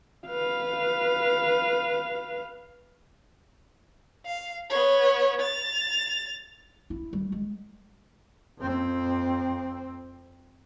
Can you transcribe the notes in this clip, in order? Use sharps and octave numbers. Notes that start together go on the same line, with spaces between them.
B4 F5
F5
B3 C#5
A6 F7
E4
G3
G#3
F2 C4